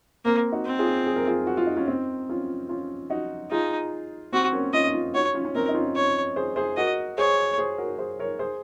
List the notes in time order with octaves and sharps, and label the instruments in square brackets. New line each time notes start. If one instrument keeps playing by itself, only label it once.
[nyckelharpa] A#3 [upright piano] C4
[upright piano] D#4 F#4
[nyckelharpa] C4
[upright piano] F4 G#4
G#4
A#4
F4 G#4
F#4
F4
D#4
C#4 F4
C4 D#4
C#4 F4
C#4 F4
D#4 F#4
[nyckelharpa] D#4 [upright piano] F4 G#4
[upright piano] C4 [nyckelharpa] F#4
[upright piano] A#3 C#4
[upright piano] C#4 F4 [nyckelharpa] D#5
[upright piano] D#4
C#4 F4
[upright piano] D#4 F#4 [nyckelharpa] C#5
[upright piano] C#4 F4
C#4
[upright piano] C4 D#4 [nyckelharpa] A#4
[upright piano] D#4
C#4 F4
[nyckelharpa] C#5
[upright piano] G#4 C5
G#4 C5
[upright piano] F#4 A#4 [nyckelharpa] D#5
[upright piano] G#4 C5 [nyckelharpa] C#5
[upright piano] G#4 C5
F#4 A#4
C#5
G#4 C5
A#4 C#5
G#4 C5